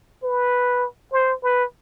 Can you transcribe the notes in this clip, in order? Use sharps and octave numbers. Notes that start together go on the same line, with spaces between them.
B4
C5
B4